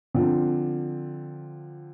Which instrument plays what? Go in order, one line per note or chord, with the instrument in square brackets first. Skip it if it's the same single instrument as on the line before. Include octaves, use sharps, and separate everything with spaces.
[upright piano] D3 F3 C4 F4